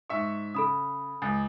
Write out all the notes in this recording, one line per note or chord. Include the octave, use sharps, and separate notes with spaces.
G#2 E5 C#6
C#3 A4 B5 D#6
C#2 G#5 D#6 A6